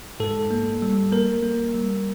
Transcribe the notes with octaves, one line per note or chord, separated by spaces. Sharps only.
G#2 A4
A#3
G3
A#3 A#4
A#3
G3